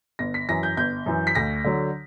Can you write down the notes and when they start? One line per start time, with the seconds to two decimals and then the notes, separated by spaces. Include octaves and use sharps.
0.19 G1 A#6
0.34 B6
0.49 F#2 E3 A#6
0.63 G6
0.77 G1 G6
1.06 F#2 E3
1.27 B6
1.35 D2 A#6
1.64 D3 F#3